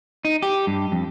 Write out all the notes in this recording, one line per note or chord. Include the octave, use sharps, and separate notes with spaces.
D#4
G4
G2
F2